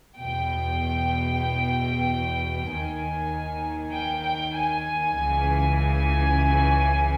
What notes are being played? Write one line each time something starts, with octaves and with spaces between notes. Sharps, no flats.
E2 B2 G5
D#2 D#3 G#5
G5
G5
G#5
C#2 C#3 E3
G#5